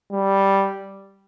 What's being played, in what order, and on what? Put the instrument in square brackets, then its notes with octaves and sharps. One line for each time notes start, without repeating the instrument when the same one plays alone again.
[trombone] G3